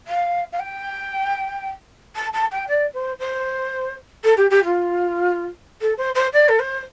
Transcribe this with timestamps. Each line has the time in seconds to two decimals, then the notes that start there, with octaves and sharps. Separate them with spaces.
0.07 F5
0.52 F5
0.59 G5
2.16 A5
2.33 A5
2.51 G5
2.68 D5
2.94 C5
3.20 C5
4.24 A4
4.37 G4
4.50 G4
4.64 F4
5.81 A4
5.97 C5
6.15 C5
6.33 D5
6.48 A4
6.59 C5